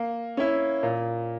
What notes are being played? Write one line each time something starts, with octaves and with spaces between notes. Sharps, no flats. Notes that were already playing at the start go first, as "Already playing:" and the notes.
Already playing: A#3
C#4 E4
A#2